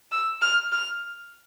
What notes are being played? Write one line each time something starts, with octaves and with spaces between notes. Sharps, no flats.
E6
F6
F6